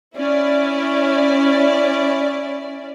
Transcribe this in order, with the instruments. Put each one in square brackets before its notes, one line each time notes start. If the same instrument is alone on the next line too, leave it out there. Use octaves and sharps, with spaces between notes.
[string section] C#4 E4 D5